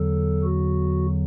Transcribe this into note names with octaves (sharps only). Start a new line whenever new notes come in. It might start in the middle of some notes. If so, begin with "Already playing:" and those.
Already playing: E2 D3 F#3 A4
F#4